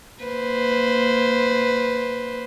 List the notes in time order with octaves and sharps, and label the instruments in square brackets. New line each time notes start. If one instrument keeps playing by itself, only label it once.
[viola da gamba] A#3 B4 C5